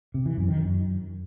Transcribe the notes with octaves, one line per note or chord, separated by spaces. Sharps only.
C3
E3
F#2
D#3
F#2